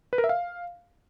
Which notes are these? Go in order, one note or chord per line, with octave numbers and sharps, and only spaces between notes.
B4
A#4
E5
F5